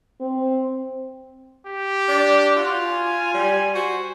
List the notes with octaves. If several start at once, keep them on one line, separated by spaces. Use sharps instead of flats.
C4
G4
D4
F4 F#4
G#5
G3
F#4 C5